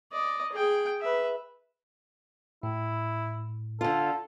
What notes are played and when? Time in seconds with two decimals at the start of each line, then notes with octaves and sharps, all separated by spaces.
0.12 D5 D#5
0.53 G#4 G5
1.01 B4 E5
2.63 A2 E4
3.81 D3 F4 A4